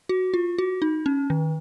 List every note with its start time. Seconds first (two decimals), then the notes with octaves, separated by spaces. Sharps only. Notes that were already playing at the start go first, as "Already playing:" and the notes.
0.09 F#4
0.34 F4
0.58 F#4
0.82 D#4
1.06 C#4
1.30 D#3